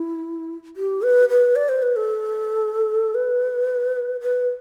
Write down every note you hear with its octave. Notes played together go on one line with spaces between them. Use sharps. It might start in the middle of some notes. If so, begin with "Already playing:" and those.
Already playing: E4
G4
B4
B4
D5
C5
B4
A4
B4
B4